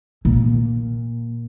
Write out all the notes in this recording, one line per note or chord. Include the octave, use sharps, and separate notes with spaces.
A#2